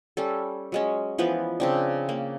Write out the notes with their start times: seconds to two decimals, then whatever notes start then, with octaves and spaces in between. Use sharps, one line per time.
0.17 G3 C#4 A4
0.72 F#3 G#3 C#4
1.18 E3 F3 B3 B4
1.60 C#3 C4 D4
2.09 A#3